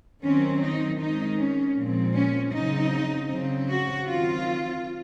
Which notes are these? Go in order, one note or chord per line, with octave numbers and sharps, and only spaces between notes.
D#3 F#3 C4 C#4
D#4
D#3 G#3 C4 D#4
C#4
A#2 F3 G#3 C4
C#4
C#3 F#3 C4 D#4
C#3 F#3 C4
F#4
D#3 F#3 C4 F4